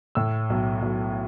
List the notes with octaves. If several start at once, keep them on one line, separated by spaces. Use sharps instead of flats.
A2 E6
B1
B1